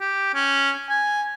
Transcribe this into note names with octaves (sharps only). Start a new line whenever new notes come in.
G4
C#4
G#5